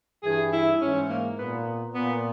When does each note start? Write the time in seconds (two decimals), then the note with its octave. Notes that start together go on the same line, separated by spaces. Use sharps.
0.24 G2 E3 G#4
0.52 E4
0.81 G#2 E3 C#4
1.09 A#3
1.38 A#2 B3
1.94 A#2 B3